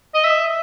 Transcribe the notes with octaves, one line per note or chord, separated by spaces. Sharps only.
D#5
E5